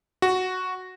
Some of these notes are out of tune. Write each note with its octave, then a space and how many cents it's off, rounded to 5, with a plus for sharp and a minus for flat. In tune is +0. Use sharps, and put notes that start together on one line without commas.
F#4 +0